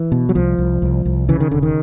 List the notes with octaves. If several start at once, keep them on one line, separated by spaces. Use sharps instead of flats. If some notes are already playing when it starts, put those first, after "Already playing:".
Already playing: E3
B2
F#3
C2 F3
C2
C2
C2
C#3 E3
D#3
E1 D3
D#3